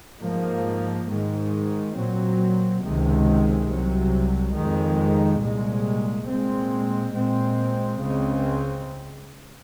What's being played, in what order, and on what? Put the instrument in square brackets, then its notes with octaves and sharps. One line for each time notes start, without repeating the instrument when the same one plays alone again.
[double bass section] G#2 F3 A#3
G#2 D#3 G#3
A#2 F#3 C4
C#2 C3 D#3 G#3
C2 C3 F#3
F2 D#3 G#3
C2 A#2 G#3
A#2 G#3 C4
A#2 G#3 C4
C#2 C#3 G#3 C4